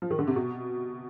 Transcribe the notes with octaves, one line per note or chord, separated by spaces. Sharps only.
F3
D#3
D3
C3
B2